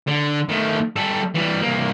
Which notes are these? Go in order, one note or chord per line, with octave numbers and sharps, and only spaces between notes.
D3
D#3 A3
G3 A4
E3 G3
C2 A#3